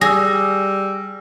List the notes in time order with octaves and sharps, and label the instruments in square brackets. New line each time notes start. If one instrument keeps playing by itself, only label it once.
[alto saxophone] G3 [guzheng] G#4 [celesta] E6 A#6